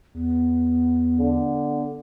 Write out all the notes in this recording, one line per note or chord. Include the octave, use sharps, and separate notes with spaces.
E2 B3
D3